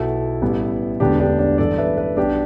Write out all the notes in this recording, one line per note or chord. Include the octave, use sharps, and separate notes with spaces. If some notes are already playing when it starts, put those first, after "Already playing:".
Already playing: B1 B2 B3 E4 A4
A1 A2 G3 B3
E1 D2 D3 B3 D4 G4
D4 G4
D4
A1 G2 E3 A4 D5
B4 E5
B4 E5
B1 B2 G3 D4 G4